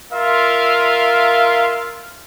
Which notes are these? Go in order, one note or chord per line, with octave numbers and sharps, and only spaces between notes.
F4 A#4 E5 F5